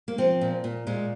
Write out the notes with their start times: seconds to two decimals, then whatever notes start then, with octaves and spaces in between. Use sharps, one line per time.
0.08 A#3
0.18 F3 C4
0.41 A#2
0.64 A#2
0.87 A#2 G#3